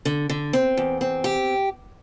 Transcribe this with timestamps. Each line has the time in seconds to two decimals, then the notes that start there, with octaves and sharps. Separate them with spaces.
0.05 D3
0.29 D3
0.53 C4
0.77 E2
1.01 C4
1.24 G4